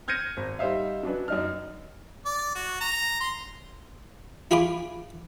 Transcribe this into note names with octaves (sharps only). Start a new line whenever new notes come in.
F6 G6 G#6 A#6 C#7 D#7
G#1
G3 D#4 C5 E5 F5
F#3 C#4 D4 B4
F#2 D#4 F6
D5
F#4
A#5
C6
E4 F4 G#4 B5 D6